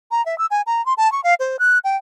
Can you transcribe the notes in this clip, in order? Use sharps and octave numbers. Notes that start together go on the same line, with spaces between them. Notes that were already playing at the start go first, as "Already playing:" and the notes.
A#5
E5
E6
G#5
A#5
C6
A5
C#6
F5
C5
F#6
G5